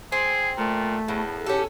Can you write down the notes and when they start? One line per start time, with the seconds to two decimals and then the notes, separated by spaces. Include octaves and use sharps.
0.12 C4 G#4
0.58 A#2 A3
1.08 E2 A2
1.46 C#4 G4 A4